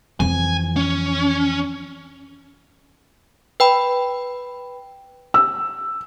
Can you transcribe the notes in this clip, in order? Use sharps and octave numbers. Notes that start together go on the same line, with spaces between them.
F2 E3 G#5
C#4
B4 G5 B5
E6